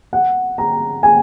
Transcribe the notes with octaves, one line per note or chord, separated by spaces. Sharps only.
F#5
A#5
G#5